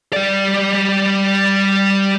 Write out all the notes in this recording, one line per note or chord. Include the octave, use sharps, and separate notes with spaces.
G3 D5